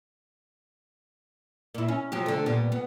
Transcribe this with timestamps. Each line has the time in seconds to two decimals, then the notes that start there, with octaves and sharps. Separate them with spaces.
1.75 A#2 E4
1.88 C#4
2.12 F3 F#3 G4
2.26 D3 A3
2.46 A#2 G3 B3
2.72 B3